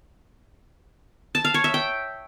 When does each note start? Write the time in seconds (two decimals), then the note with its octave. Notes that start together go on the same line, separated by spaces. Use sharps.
1.35 A5
1.45 F5
1.54 C#5
1.64 E5
1.74 G5